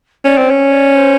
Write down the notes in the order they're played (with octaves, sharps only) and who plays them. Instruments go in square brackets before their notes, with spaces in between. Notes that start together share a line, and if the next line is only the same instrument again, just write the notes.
[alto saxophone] C#4 [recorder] D5
[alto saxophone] C4
[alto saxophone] C#4 [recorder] C#5
[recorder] D5
C5